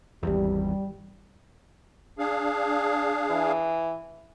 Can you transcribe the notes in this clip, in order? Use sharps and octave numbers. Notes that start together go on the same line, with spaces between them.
G#1 E2 G3
D4 G#4 F5
E3